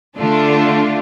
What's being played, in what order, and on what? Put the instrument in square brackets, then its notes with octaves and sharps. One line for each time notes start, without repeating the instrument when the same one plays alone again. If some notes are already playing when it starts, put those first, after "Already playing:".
[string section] D3 A3 D4 F4